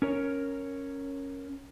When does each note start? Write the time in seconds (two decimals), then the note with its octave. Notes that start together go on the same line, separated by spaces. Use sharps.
0.02 C#4 A#4 C#5